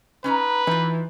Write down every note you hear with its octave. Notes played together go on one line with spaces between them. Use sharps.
C#4 D#4 B4 A#5
E3 D#4 F4